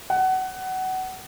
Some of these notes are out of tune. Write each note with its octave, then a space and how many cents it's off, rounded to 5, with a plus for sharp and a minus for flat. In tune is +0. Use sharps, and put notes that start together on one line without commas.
F#5 +20